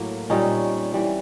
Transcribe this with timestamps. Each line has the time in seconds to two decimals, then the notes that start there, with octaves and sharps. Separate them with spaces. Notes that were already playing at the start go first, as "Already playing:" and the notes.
Already playing: A2 F#3 A#3
0.30 A#2 G3 C4 C#4 D#4
0.94 E3 G3